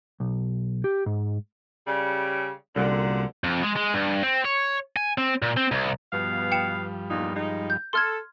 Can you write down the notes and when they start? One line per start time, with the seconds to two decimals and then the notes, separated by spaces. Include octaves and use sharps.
0.20 B1
0.84 G4
1.06 G#2
1.87 C#3 G3
2.76 C2 F#2 A#2 D3
3.44 F2
3.63 G#3
3.76 G#3
3.94 G2
4.23 C4
4.45 C#5
4.96 G#5
5.18 C4
5.42 A#2
5.57 C4
5.71 C2
6.13 G2 B2 F3 G3 B3 F5
6.52 G5 C#7 E7
7.10 E2 A#2 D#4
7.34 G#3 D#4
7.70 G6
7.93 A4 C6 F6 G#6